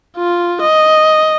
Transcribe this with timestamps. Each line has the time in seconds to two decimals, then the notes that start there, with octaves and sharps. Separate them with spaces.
0.17 F4
0.62 D#5